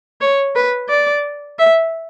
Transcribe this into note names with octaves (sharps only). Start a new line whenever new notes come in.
C#5
B4
D5
E5